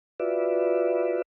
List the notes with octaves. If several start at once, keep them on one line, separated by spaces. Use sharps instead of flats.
F4 F#4 B4 D5 E5